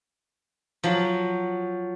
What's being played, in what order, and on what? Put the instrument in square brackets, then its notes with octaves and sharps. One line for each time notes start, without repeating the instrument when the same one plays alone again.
[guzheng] F3 F#3